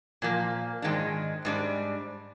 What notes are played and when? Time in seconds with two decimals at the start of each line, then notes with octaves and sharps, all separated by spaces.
0.22 A#2 F3 A#3
0.82 G#2 D#3 G#3 D4
1.45 G#2 G3 D4